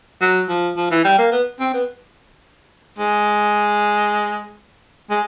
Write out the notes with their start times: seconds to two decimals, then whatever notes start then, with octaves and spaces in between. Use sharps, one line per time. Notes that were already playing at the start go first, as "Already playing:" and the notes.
0.21 F#3
0.49 F3
0.77 F3
0.90 E3
1.04 G3
1.18 A#3
1.32 B3
1.60 C4
1.74 B3
2.99 G#3
5.10 G#3